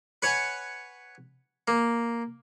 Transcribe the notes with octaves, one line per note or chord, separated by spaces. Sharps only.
B4 C#5 F#5 G#5
A#3